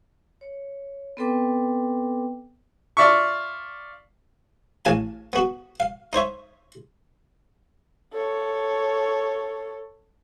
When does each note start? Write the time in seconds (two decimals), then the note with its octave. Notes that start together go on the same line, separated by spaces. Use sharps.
0.41 C#5
1.17 B3 C4 A4 B4 G5 D6
2.97 F4 D5 E5 C#6
4.85 A1 F5 G#5 A5
5.33 B3 F#4
5.80 F5
6.13 D#4 C5 C#5 E5
8.13 A4 C#5